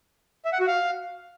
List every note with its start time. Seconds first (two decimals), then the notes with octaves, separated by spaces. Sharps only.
0.45 E5
0.53 F#5
0.60 F#4
0.67 F5